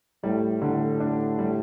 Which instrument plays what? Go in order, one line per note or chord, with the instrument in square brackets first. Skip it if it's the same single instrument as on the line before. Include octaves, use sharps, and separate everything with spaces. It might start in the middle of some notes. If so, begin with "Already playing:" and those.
[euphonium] A2 [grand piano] G3
[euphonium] A2 [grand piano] D3
[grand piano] D4
G3